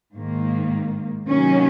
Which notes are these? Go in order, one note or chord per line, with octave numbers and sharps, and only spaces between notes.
G#2 D#3 A#3
C3 D#3 F#3 A#3 C#4